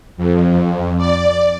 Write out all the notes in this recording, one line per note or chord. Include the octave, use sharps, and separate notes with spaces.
F2
D5